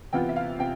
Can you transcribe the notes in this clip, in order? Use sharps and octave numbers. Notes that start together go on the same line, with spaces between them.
C3 E3 B3 F4 G5
E5
F5
C3 G5